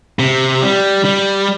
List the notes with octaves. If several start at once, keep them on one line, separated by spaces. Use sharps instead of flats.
C3
G3
G3